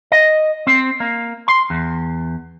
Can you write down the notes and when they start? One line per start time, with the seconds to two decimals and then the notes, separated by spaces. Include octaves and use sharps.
0.12 D#5
0.67 C4
1.00 A#3
1.48 C6
1.70 E2